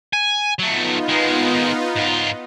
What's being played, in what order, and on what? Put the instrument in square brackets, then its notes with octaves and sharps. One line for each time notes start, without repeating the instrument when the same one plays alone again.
[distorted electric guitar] G#5
[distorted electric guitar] F#3 A3 [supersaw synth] B3 D#4 F4
[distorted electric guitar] D#3 G#3
G#2 F4